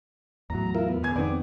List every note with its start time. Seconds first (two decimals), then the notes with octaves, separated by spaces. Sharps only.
0.50 E2 A2 F#3 A#5
0.75 E4 F4 A#4
0.88 B3
1.03 E1 G#5 G#6
1.16 F2 D#3 B3 C4 D5